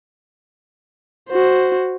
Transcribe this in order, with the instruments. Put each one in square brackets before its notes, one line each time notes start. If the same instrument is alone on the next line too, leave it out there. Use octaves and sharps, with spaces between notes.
[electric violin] F#4 C5